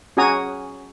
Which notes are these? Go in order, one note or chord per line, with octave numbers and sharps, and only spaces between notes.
C#4 F#4 G#4 G#5 A#5 D#6